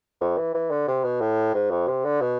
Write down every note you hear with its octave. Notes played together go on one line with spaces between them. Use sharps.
F2
E3
E3
D3
C3
B2
A2
G#2
F2
C3
D3
B2